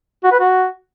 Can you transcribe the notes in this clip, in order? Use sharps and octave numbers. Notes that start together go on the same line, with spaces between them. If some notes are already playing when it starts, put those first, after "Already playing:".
F#4
B4
F#4